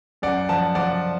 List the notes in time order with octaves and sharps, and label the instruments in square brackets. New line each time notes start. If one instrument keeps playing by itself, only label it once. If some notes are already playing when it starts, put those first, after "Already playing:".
[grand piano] F#2 D5 F#5
F3 F#5 A5
F3 D5 F#5